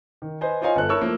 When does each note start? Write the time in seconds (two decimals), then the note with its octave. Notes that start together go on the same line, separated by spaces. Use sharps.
0.22 D#3
0.41 B4 C5 D#5 G#5
0.61 F4 C5 C#5 D#5 F5 G#5
0.76 G1 A4 F#6
0.89 E4 A#4 C#5 A5 C#6 E6
1.01 F3 A3 A#3